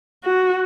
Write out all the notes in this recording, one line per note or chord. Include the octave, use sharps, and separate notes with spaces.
F#4